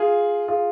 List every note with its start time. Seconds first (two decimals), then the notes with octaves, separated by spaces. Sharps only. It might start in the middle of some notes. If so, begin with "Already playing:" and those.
Already playing: F4 G#4
0.48 F4 G#4